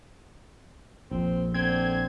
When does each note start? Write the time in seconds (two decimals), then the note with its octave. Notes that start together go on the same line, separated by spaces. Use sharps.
1.11 A#1 F2 C4
1.54 D3 C4 G#6